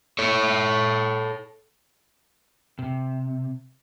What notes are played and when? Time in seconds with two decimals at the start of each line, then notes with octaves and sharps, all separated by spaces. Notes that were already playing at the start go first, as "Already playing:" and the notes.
0.19 A4 C#5
2.79 C3